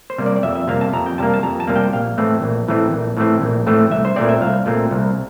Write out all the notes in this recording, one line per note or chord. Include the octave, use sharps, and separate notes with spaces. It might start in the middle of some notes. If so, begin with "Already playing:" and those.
C5
C3 G3 A#3
D5
D5
F2 E5
E5
C3 G3 A#3 F5
A5
F2 A#5
G5
C3 G3 A#3 A5
A5
F2 A#5
A5
C3 G3 A#3
G5
A#1 F5
A2 E3 A3 C4
A#1
A2 E3 A3 C4
A#1
A2 E3 A3 C4
A#1
A2 E3 A3 C4
C2 E5
C5
A#2 A3 C4 D5
E5
C2 F5
A#2 A3 C4
C2